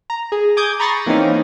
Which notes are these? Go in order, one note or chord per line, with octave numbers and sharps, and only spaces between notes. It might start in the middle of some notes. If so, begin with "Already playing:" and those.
A#5
G#4
G#5 D6 D#6 G6 G#6
A#5 B5 C#6 A6 A#6 C7
E3 A#3 C4 C#4 D#4